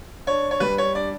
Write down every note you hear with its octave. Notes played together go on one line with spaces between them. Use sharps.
D4 C#5
C#5
G3 B4
C#5
D4 D5